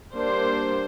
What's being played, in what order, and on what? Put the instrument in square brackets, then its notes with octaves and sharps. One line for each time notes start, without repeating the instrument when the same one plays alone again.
[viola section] G3 A#3 D4 C5